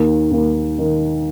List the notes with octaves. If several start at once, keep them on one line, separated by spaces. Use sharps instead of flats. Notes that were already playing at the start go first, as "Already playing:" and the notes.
Already playing: D#2
D#2
D#3